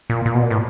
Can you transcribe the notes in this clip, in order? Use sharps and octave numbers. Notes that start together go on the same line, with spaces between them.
A#2
A#2
B2
A#2
A2